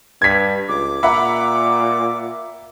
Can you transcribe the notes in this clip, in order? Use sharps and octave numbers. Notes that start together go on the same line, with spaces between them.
G2 G#6 B6
C#2 D6
A#2 E5 F#5 A#5 B5